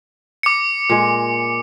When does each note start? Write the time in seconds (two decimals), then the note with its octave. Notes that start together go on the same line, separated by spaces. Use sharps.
0.43 D6 C#7
0.90 A#2 G#3